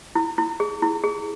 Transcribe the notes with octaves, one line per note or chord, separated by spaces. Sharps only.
E4
E4
G#4
E4
G#4